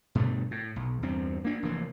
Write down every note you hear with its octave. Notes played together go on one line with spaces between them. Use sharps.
G2 B2 D3 A3
A2
B1
E2 G2 C4
A#3 D4
F1 E3 A#3